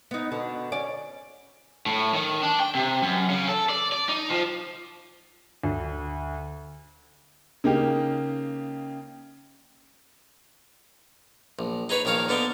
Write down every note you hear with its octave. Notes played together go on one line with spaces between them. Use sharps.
B3 D#4
B2 D3
C#4 D5
A2
D#3
D4
G5
C3
F#2
C#3
A4
D5
D5
D#4
F3
D2
C#3 A#3 D#4 G4
A#1
D#4 G#4 B4 C#5 B5
A#1 D#3 A#4 C#5 F5
D3 B3 D4 D#4